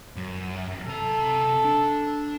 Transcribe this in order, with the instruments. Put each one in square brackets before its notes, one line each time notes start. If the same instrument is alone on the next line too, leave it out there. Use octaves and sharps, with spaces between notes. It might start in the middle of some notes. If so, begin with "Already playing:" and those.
[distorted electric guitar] F#2
[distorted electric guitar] C3 A#5 [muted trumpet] A4
[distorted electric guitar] D4